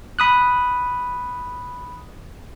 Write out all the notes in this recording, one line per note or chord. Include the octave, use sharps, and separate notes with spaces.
B5 D#6 F#6